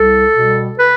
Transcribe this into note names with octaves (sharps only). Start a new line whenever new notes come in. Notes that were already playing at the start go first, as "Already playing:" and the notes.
Already playing: C2 A4
B2 G3
B4